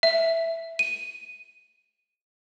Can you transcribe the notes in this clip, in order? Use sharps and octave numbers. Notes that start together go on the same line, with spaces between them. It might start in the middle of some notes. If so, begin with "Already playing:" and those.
E5
D#7